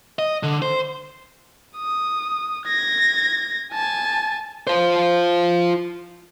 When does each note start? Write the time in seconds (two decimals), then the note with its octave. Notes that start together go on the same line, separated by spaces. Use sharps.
0.19 D#5
0.43 D3
0.62 C5
1.77 D#6
2.67 G#6 A#6
3.73 G#5 A5
4.67 F4 C5